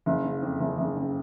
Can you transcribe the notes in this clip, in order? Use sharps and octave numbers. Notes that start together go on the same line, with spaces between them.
F#1
C#3
F2
F#1
F#1
C#3